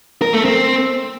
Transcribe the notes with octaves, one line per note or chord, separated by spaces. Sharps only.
A#4
A3
C4